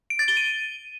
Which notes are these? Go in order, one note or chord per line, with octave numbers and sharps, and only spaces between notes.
D7
A6
G7
D#7